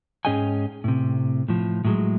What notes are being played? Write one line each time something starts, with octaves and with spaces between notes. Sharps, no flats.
G#2 C#4 G#4 D#5 G5 G#5
A2 C3
A2 F3
A2 F#3 G#3